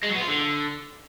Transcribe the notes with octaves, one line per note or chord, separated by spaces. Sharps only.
G#3
F#3
B3
F4
D3